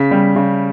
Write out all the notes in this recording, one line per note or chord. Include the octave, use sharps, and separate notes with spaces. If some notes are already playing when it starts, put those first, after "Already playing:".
Already playing: C#3 B6
G3
C#3